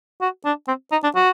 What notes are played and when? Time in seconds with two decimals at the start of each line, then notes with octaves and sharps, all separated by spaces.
0.21 F#4
0.45 D4
0.68 C4
0.92 D#4
1.04 D4
1.15 F#4